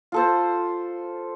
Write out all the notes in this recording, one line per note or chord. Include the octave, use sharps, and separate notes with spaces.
F4 A4 C5